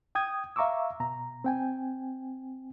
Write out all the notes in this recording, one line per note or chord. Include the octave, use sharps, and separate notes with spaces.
G5 D#6 G#6
E5 F5 A#5 C#6 D6 E6
B2 A#5
C4 G5 G#5